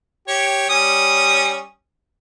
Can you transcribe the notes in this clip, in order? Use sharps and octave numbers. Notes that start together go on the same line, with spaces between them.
G4 C#5
G3 C#4 D#6